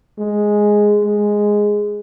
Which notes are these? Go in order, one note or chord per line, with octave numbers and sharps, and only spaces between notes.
G#3
G#3